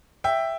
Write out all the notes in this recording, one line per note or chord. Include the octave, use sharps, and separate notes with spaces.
E5 G5